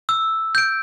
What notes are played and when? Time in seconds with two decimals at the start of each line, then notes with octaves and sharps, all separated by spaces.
0.09 E6
0.55 G6 D7